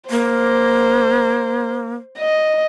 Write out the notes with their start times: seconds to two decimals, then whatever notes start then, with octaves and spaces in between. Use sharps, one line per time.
0.10 A#3 C5
2.19 D#5